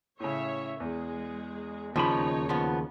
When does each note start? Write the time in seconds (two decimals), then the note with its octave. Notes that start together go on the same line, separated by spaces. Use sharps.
0.20 A2 C#3 C#5 E5
0.80 E2 G#3 G#4
1.96 D#2 C#3 F3 D#4 C#5 B5
2.49 F3 B3